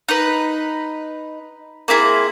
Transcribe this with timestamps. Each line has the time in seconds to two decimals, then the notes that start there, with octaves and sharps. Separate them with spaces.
0.09 D#4 B4
1.88 A#3 C4 E4 G#4